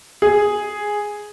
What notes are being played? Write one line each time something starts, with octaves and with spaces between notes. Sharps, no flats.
G#4